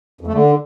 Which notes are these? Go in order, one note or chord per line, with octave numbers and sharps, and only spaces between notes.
F2
A3
D3